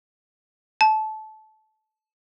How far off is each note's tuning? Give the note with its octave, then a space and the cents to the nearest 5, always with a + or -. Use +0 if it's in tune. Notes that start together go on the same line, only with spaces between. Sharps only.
A5 -20